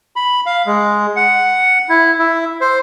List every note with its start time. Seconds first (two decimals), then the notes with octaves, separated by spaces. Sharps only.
0.16 B5
0.46 F5
0.66 G#3
1.16 F#5
1.89 E4
2.19 E4
2.61 C5